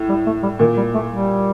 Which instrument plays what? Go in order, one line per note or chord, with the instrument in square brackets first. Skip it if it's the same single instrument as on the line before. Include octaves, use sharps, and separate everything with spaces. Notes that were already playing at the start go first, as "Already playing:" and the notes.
Already playing: [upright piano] A2
[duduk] G3
A3
G3
[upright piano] A#2 [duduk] D#3
[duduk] G3
A3
G3